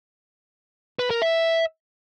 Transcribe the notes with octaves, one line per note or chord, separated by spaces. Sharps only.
B4
A#4
E5